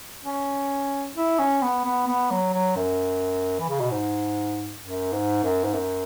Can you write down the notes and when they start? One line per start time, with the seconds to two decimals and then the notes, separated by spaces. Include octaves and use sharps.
0.25 C#4
1.16 E4
1.39 C#4
1.62 B3
1.85 B3
2.07 B3
2.31 F#3
2.53 F#3
2.76 F#2
3.59 E3
3.69 C#3
3.80 B2
3.91 G#2
4.83 F#2
5.13 G#2
5.44 F#2
5.64 G#2
5.74 F#2